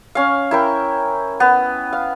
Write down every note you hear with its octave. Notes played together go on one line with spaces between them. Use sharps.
C#4 F5
E4 A#4 G5
B3
F5